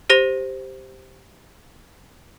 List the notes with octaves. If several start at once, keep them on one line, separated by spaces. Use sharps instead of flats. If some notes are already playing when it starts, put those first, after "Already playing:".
G4 C5 A#6 F7